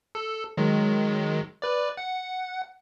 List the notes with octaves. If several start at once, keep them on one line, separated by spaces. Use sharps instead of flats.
A4
D#3 F#3 G#3
B4 D5
F#5